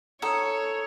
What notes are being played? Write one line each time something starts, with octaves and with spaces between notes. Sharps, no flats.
D#4 A4 C#5 E6